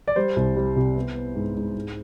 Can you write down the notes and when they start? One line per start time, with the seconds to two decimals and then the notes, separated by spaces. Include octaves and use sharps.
0.08 D5
0.16 G3 C5
0.36 C2
0.56 G3
0.76 C3
0.95 B3
1.15 B3
1.36 G#2
1.56 G#2
1.75 G#2